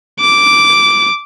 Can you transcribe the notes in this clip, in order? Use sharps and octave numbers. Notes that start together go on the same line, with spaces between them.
D6